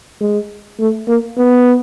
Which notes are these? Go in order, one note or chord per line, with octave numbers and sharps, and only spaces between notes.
G#3
A3
A#3
B3